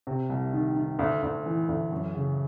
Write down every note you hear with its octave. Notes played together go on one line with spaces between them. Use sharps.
C3
C2
D#3
D#3
D2
D2
E3
D2
F#2
C#3